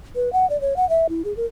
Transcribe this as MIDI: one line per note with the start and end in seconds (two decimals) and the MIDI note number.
0.15 0.32 71
0.33 0.48 78
0.50 0.60 74
0.61 0.76 73
0.76 0.88 78
0.89 1.07 76
1.09 1.22 64
1.25 1.35 68
1.37 1.46 70